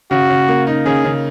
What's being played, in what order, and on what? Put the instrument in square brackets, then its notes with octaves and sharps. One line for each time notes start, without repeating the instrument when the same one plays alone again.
[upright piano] C#3 [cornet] F#4
[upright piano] C#3
A#3
D#4
[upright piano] C#3 [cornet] G#4
[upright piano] C#3